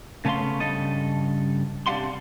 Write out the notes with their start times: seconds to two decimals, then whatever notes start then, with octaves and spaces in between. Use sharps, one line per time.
0.25 C#3 A3 B3 C#4 F5 C6
0.60 G2 C#3 A4 D#5
1.87 C3 D4 G4 F5 F#5 C6